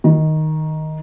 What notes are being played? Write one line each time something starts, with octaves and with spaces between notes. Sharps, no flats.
D#3